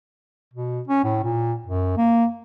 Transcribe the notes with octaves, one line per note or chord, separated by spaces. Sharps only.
B2
C#4
A2
A#2
F#2
A#3